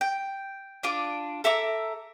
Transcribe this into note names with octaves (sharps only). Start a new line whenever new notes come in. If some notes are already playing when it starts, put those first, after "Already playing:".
G5
D4 F4 D6
A4 E5 A#5 D6